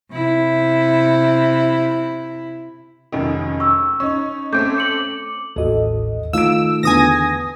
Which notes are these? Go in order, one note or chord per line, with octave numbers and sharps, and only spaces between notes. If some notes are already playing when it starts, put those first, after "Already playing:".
C3 E4
F1 F#2 D#3
C#6 E6
C#4 D#4 C#6
A3 C4 C#4 D6 G6
D6 C#7 F#7
A1 D#2 F#4 A4 D#5
D#3 A3 D#4 F4 F5 E6 D7
E2 D3 G#5 D#6 A#6